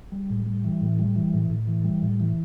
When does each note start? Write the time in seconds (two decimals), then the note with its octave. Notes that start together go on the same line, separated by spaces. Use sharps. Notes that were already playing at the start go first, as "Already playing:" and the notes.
0.12 G3
0.30 A2
0.46 G3
0.64 E3
0.81 A2
0.99 G3
1.16 E3
1.34 A2
1.50 A2
1.68 E3
1.84 G3
2.02 A2
2.20 E3